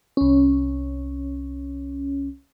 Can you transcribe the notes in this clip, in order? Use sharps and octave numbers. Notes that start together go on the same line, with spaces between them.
C2 C#4